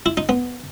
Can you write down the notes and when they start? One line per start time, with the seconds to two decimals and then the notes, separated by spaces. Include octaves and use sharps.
0.06 E4
0.17 D#4
0.29 B3